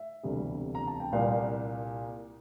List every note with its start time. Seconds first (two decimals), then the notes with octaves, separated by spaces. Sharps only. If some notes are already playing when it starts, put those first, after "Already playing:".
Already playing: E5
0.23 E1 D2 C3 G3
0.75 A#5
0.87 A5
1.00 G5
1.12 C2 A#2 G3 A#3 F5